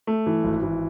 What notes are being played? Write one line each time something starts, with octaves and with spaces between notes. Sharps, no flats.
A3
E3
G#1
E3